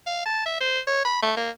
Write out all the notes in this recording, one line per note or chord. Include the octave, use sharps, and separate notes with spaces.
F5
A5
E5
C5
C#5
B5
A3
A#3